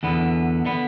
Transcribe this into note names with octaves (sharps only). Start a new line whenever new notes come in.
E2 D3 B3
D3 B3